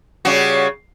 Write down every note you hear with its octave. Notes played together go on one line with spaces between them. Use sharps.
C#3 G3 F#4